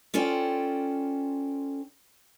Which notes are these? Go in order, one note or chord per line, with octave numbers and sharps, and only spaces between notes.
C#4 F4 A4 C5 D5 G5